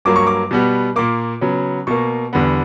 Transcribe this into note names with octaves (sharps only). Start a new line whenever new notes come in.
G2 F#3 A#3 D6
C#6
D6
B2 G3 B3
A#2 A#3 D6
C#3 F#3 B3
B2 A#3 C#6
E2 D3 G3 B3